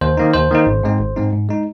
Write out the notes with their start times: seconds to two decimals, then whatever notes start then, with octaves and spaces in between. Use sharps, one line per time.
0.01 D#2 C5
0.17 D#3 A#3 D#4
0.34 D#2 C5
0.51 D#3 A#3 D#4
0.67 G#1
0.83 G#2 G#3 C4 D#4
1.00 G#1
1.16 G#2 G#3 C4 D#4
1.33 G#2
1.49 G#3 D#4